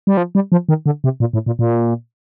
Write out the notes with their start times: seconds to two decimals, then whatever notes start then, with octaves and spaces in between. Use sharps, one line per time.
0.07 G3
0.17 F3
0.35 G3
0.52 F3
0.69 D#3
0.86 D3
1.04 C3
1.20 A#2
1.33 A2
1.46 A#2
1.59 A#2